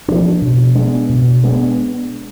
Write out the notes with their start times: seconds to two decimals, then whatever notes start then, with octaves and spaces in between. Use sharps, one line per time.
0.08 F3 A#3 D4
0.41 B2
0.75 G#3 B3 D4
1.09 B2
1.43 G#3 B3 D4